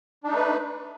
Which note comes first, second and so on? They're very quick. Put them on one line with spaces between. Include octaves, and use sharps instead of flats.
D4 D#4 A3 B4